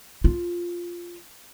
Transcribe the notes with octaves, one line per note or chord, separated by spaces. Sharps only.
F4